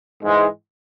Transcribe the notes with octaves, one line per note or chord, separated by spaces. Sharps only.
G#2 E3 G#3